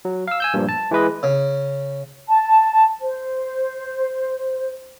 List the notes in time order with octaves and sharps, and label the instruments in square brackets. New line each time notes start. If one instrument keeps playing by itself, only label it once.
[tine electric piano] F#3
F5 E6
G#5 E6 G6
G2 A#2 F3
A5
E3 G#3 B4 D#5
[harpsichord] C#3
[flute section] A5
C5